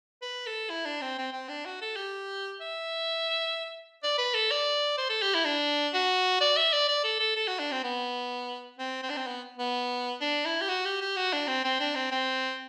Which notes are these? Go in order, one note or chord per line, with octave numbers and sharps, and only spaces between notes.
B4
A4
E4
D4
C4
C4
C4
D4
F#4
A4
G4
E5
D5
B4
A4
D5
C5
A4
G4
E4
D4
F#4
D5
E5
D5
D5
A4
A4
A4
F#4
D4
C4
B3
C4
C4
D4
C4
B3
B3
D4
E4
G4
F#4
G4
G4
F#4
D4
C4
C4
D4
C4
C4